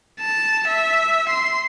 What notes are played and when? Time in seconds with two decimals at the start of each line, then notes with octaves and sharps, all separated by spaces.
0.21 A5
0.68 E5
1.29 C6